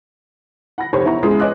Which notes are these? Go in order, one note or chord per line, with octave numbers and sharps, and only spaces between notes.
F#5 B5 A#6
F1 G4 C5 C#5 B5
B3 E4 F#5 A#5 C#6
G#3 B3 C#4 E4 F4 G#4
B4 C#5 D#5 G#5 D6 F#6